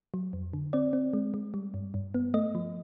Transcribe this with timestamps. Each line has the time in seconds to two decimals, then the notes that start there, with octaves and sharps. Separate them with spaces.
0.14 F#3
0.33 F2
0.53 D3
0.73 C4 D5
0.93 C4
1.13 G#3
1.34 G#3
1.54 G3
1.74 G2
1.94 G2
2.14 B3
2.34 A3 D#5
2.55 F3